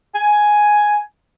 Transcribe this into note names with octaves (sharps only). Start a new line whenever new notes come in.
G#5